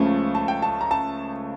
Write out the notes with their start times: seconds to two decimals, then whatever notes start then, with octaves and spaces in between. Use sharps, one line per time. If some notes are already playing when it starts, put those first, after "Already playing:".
Already playing: C#2 C#3 F3 A3
0.35 A5
0.48 G5
0.62 A5
0.81 A#5
0.91 A5